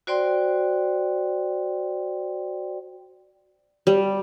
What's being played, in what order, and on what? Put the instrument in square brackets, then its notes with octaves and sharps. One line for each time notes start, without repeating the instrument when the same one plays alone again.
[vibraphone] F#4 C5 D5 G5 C6
[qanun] G3